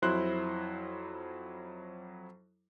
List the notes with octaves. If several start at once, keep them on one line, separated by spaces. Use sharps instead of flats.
F2 F#3 E4 C5 C6 F#6